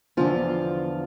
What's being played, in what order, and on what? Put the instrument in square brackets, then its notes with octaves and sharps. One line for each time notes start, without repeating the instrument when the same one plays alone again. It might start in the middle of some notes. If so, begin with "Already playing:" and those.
[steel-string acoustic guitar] E2 D3 F3 F4